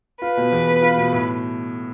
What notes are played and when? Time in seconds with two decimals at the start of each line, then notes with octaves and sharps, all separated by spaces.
0.22 F4 B4
0.37 B2
0.52 E2
0.68 B3
0.82 F4
0.97 B2
1.12 A2